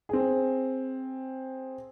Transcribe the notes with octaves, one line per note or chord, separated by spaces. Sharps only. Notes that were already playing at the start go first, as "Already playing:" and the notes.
C4 G#4